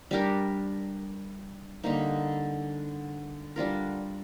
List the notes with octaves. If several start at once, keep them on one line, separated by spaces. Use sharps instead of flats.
G3 D4 G4 A#4
D3 G3 A#3 D#4
G3 D4 F4 A#4